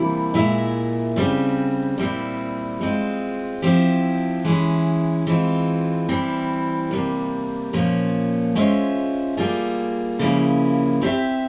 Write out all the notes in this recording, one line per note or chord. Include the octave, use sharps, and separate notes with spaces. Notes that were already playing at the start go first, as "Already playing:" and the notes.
Already playing: C3 E3 G3 A#3 E4
A#2 G#3 E4 A#4 E5
C#3 G3 C4
A#2 G3 C4 E4
G#3 C4 F4
F3 C4 E4 G4
E3 G#3 C#4 E4 G#4
E3 G#3 C4 F4
E3 G3 C4 E4
C3 G3 A#3
A#2 F3 A#3 C#4
G#3 C#4 F4 C5 E5
G3 A#3 F4 G#4
C#3 F3 A#3 C#4 E4
C4 G4 C5 E5